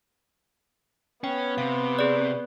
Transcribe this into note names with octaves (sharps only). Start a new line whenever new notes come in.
B3 C#4 G5
C3 F5
G#4 D5